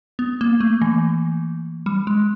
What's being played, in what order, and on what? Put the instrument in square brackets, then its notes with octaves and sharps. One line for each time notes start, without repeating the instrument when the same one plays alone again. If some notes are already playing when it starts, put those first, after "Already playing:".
[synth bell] B3
A#3
A3
E3
G3
G#3